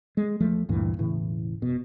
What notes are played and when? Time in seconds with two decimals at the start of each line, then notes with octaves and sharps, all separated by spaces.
0.17 G#3
0.40 E2 F3 A3
0.69 D2 G2 A#2 E3
0.99 E1 A2 C#3 E3
1.62 F1 B2